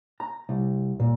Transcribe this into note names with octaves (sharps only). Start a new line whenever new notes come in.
A#5
C2
A#2